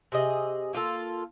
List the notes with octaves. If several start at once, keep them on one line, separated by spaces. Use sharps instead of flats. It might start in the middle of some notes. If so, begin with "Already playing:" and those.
C3 G#4 D#5
A#3 F4 G4 A4